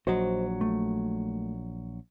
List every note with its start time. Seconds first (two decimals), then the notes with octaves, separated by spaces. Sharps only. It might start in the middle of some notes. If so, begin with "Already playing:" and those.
0.07 A#1 F#3 F#4 C5 D#5
0.61 A3